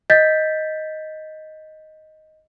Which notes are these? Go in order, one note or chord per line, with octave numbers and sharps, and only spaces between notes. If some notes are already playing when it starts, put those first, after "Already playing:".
D#5 G6 A6 B6